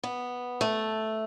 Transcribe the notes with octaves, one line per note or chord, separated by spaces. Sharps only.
B3
A3